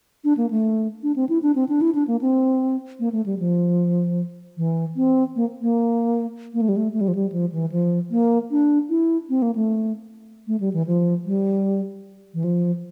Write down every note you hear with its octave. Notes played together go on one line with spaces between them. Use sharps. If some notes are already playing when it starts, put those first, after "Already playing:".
D4
A#3
A3
D4
C4
E4
D4
C4
D4
E4
D4
A#3
C4
A#3
A3
G3
F3
E3
C4
A#3
A#3
A#3
A3
G3
A3
A3
G3
F3
G3
F3
E3
F3
A#3
D4
E4
C4
A#3
A3
A3
G3
E3
F3
G3
E3
F3